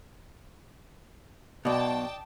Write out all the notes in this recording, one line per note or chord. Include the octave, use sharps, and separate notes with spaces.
B1 B2 D5 D#5 G5 A5